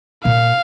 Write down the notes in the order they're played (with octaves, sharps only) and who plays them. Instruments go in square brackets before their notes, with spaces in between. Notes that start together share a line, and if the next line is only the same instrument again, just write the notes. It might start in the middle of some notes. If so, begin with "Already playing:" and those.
[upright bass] A#2 [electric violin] F5